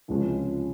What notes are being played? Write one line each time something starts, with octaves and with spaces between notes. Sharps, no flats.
C#2 C3 F3 G#3 C#4